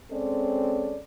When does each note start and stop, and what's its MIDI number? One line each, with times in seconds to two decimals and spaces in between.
0.11 1.00 56
0.11 1.00 60
0.11 1.00 61
0.11 1.00 69
0.11 1.00 74